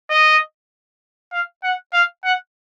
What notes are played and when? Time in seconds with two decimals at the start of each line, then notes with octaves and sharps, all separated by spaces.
0.10 D#5
1.32 F5
1.64 F#5
1.93 F5
2.24 F#5